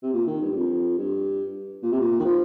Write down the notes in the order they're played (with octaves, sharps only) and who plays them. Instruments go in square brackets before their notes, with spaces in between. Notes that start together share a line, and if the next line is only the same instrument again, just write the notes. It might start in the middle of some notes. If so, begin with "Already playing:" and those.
[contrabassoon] C3
A#2
D#3
G2
G2
F2
G2
A#2
C3
A#2
D#3
F3